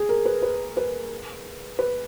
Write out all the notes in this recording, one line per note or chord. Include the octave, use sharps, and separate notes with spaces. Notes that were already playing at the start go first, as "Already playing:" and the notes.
Already playing: G#4
A#4
B4
B4
B4
B4